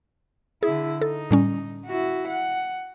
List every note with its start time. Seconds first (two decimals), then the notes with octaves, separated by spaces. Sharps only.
0.63 D3 E4 G#4
1.01 D#4 A4
1.31 A2 G3 C#4
1.86 E4 F#4
2.28 F#5